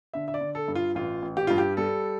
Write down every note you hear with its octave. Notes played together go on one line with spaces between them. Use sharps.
D3 E5
E5
D5
D3
A4
G2
F4
A1 F4
A1
G4
G2 F4
G4
G3 A4